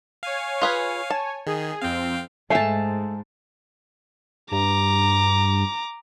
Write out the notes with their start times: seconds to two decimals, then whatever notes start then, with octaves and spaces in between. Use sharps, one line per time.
0.23 C#5 F5 G#5
0.62 F4 G#4 B4
1.10 A5
1.47 D#3 G#4
1.82 F2 C4 F5 G5
2.50 G#2 A3 A4 E5 F5 G#5 A5
4.51 G2 A#5 D6